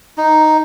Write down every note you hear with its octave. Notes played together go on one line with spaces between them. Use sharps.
D#4